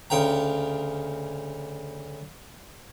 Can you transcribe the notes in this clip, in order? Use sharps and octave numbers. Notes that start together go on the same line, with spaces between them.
D2 C#3 G5 A#5